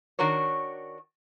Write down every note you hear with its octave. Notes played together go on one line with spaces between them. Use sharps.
D#3 D4 F#4 A#4 C#5